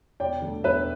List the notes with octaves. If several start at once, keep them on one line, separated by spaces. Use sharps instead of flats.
E1 D5 G5
D2 D3
E1 B4 E5